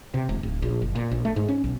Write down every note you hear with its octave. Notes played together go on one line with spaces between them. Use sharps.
C3
E1
D1
A#1
F#1
A#2
A#1
A3
G#2
C#4
B1